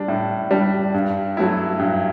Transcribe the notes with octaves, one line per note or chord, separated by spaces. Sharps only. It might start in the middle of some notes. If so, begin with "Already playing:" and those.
Already playing: G3 D4
A2
G3 D4
G2
F#3 A3 E4
G2